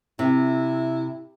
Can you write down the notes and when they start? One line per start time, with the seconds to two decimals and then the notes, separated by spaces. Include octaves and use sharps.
0.19 C3 E4